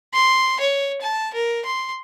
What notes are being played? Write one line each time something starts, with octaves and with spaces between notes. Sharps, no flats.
C6
C#5
A5
A#4
C6